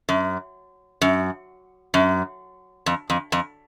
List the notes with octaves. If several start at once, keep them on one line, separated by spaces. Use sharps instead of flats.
F#2
F#2
F#2
F2
F2
F2